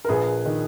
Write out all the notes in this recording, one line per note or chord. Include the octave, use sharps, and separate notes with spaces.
A#4
A#1 G#4 B4
D#3